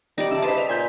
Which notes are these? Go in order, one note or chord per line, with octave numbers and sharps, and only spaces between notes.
G3 D#4 D5
C#3 E5 A5
B4 C5 D#5 A5
B6 F7
A#2 G#5 G6 B6